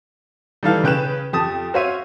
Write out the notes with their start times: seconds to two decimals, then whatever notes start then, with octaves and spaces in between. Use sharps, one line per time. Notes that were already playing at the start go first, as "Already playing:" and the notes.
0.63 D#3 E3 G3 A4 F5
0.84 C#3 C#4 B4 G5 F#6 E7
1.33 F2 G4 A5 D#6
1.74 F#4 C5 C#5 E5 F5 D#7